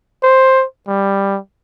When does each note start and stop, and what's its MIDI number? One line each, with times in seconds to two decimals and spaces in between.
0.23 0.64 72
0.87 1.38 55